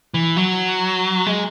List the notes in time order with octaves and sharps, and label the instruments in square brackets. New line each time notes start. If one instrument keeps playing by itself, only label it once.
[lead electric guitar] E3
F#3
G#3